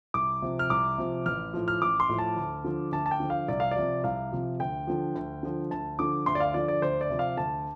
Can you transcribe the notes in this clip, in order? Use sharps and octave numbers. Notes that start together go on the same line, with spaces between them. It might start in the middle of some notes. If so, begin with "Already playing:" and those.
C2 D6
C3 F3
F6
C2 D6
C3 F3
A1 F6
A2 F3
F6
A1 D6
C6
A2 F3
A5
D2
D3 F3
D2 A5
A5
G5
D3 F3
F5
C2 D5
F5
D5
C3 F3
C2 F5
C3 F3
D2 G5
D3 F3
D2
D3 F3
D2 A5
D3 F3 D6
D2 C6
D5
F5
D3 F3 D5
D5
D2 C5
D5
C3 F3
F5
D2 A5